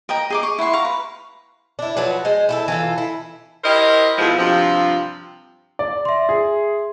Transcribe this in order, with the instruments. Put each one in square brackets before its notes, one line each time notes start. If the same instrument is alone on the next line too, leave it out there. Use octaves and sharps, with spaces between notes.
[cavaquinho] A#4 D#5 G5 A#5
G#4 D#5 D6
C#6
E4 F#5 C6 C#6
F5 A#5 C#6
B4
[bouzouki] D4 E4
F3 F#3 F#4 B4
G#3 C5
E4 G4 A4
E3 F4 A4
E4
[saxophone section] E4 G4 A#4 C5 D#5
F2 B2 F3 G#3 E4
G2 C3 F3
[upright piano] D5
[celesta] E5 C6
[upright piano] G#4